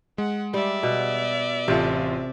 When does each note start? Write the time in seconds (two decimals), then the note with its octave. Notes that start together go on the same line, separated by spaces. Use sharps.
0.18 G#3 F#5
0.54 G3 D5 E5
0.83 B2
1.68 A1 C3 C4 F4 A4